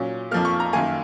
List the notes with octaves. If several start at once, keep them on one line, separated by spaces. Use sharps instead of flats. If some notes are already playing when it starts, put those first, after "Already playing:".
Already playing: A#2 F#3 C#4
F2 F3 A#3 F6
C#6
A#5
F#2 D#3 A#3 G#5